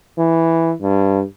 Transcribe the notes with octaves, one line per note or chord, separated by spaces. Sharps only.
E3
G2